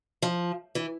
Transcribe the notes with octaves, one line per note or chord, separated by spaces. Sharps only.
F3
E3